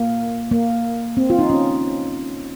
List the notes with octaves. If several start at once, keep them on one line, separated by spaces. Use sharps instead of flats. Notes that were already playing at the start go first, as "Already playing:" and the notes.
Already playing: A#3
A#3
C4
F4
D#4
C#4